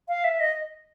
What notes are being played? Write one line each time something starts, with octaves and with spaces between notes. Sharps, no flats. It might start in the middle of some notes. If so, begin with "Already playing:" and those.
F5
E5
D#5